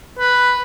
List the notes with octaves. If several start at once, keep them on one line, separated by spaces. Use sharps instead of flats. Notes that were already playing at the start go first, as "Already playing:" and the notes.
B4